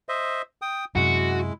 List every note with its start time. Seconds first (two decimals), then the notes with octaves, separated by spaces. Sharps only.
0.09 C5 D#5 E5
0.62 G5 D#6
0.95 F#2 C3 G#3 E4 F#4